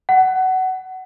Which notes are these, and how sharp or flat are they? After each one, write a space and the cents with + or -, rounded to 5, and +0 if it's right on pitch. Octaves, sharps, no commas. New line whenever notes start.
F#5 +20